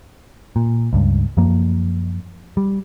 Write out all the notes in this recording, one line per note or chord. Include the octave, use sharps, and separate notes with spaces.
A#2
C#2 G2
F#2 F3 A#3
G3